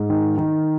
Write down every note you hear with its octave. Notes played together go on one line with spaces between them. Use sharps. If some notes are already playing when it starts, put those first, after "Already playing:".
Already playing: G#2
D#3
D#3